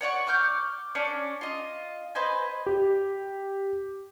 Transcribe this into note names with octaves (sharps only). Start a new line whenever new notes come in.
C#5 D5 F#5 C#6
C#6 D6 F6 G6
C#4 D4 C#5 D5
F4 D#5
B4 C5 D#5 G#5
G4